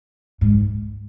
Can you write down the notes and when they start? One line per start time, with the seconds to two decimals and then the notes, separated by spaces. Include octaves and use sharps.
0.41 G#2